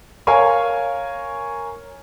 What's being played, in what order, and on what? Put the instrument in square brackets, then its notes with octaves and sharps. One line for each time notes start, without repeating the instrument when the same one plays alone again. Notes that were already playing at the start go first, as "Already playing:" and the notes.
[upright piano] A#4 C#5 F5 G#5 C#6